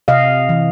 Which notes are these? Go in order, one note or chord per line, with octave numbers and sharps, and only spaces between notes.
C3 D#5 F5
E3